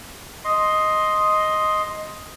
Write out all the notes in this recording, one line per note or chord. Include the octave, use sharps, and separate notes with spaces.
D#5 C6